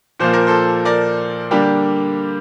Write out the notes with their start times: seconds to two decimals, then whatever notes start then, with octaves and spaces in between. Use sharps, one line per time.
0.19 A#2 F3 A#3 C5
0.33 A#4
0.47 A4 C5
0.85 A#4 D5
1.51 D3 G3 A#3 D4 G4